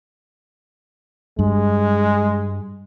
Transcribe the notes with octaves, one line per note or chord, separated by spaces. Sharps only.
G2 G#3